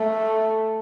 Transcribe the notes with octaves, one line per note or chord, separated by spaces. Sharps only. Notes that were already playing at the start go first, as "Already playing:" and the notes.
Already playing: A3